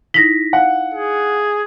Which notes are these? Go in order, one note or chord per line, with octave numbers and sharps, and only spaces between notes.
D#4 E4 A#6 B6
F5 F#5
G#4